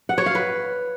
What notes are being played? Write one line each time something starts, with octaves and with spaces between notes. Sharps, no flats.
F#5
C#5
F5
B4